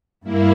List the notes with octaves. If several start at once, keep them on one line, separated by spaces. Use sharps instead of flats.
G2 A#3 E4